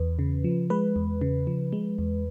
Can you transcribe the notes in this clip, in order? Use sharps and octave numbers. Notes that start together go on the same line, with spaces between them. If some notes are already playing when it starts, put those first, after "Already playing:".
Already playing: E2 B4
C#3
F3
G#3 B4
E2
C#3
F3
G#3
E2